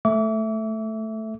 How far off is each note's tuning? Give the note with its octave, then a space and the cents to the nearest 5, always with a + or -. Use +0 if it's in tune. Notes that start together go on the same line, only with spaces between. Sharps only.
A3 +0 E5 +0 D6 -40